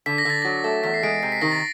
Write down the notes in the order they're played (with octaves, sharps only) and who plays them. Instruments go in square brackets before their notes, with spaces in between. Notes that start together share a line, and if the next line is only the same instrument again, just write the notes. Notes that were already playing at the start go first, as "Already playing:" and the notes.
[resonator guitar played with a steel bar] D3 [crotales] B6
[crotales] A#6
[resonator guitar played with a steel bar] D3 [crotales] A6
[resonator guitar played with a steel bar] F#3 [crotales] A#6
[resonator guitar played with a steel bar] A3
[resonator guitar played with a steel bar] E2 [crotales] B6
[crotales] C7
[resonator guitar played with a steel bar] G#3 [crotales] D7
[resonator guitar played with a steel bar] C3 [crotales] C7
[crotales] B6
[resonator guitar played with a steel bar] D#3 [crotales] A#6
[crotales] A6